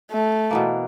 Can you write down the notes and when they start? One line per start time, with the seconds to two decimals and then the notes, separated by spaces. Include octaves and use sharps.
0.12 A3
0.51 B2 E3 A#3